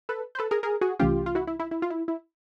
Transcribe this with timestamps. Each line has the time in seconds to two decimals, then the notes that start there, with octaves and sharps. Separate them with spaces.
0.09 A4 B4
0.35 C5
0.39 A4 B4
0.51 G#4 A#4
0.63 G#4 A#4
0.81 F#4 G#4
0.99 C2 C3 E3 A3 C#4 F4 G4
1.26 F4
1.35 E4 F#4
1.47 E4
1.60 E4
1.71 E4
1.82 F4
1.90 E4
2.08 E4